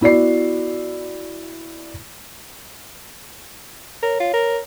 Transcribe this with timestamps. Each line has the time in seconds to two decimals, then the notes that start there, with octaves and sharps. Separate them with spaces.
0.01 B3 E4 F#4 D5 C7
4.03 A#4 C#5
4.20 F4
4.33 A#4